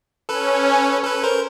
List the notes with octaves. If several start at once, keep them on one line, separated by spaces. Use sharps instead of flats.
C#4 A4 B4
A4 B4
A#4 C5